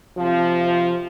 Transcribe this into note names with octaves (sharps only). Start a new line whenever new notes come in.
C3 F3